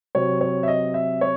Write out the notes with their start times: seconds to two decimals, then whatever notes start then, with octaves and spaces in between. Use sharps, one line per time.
0.15 C3 F#3 C4 C#5
0.41 C#5
0.63 E5
0.68 D#5
0.94 E5
1.21 C#5